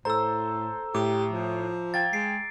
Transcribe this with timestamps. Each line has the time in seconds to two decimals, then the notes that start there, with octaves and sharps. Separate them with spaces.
0.05 A2 A4 C5 A#5 E6
0.94 A2 G4 D6
1.31 F3
1.94 F5 G5 G#6 A6
2.13 G#3 C7 D7